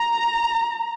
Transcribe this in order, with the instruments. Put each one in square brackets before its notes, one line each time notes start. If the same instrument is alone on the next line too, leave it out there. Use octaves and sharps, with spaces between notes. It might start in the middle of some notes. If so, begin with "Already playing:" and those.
Already playing: [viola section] A#5